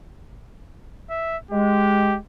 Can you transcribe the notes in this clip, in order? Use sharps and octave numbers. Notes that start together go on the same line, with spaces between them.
E5
G#3 G4